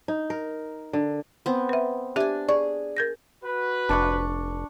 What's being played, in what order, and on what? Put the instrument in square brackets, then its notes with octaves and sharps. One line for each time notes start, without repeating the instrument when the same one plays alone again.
[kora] D#4
A#4
D3
[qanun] B3 C4
[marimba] B4 E5
[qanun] D4 G#5 [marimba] G4 E5
[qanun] G#4 [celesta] D5 [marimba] C#6
[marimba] A#4 G6 A#6
[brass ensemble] F#4 B4
[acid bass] F1 [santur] D4 C#6 D6